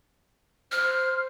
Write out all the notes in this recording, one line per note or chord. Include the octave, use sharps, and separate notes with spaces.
C5 F6